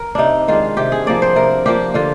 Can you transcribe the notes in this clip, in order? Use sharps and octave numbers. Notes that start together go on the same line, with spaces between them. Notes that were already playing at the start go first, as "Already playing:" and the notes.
Already playing: A#4
C3 D4 D#4
D#3 G#3 D4 F4
C3 G4
G#4
F3 A#3 D4 D5
C5
C3 A#4
F3 A#3 D4 G4
D3 F4